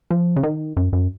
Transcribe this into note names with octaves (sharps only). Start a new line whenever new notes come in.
F3
C#3
D#3
F#2
F#2